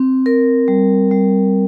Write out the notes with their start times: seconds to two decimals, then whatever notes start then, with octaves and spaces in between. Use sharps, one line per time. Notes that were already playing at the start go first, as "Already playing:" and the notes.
Already playing: C4
0.26 A#4
0.68 G3
1.11 G3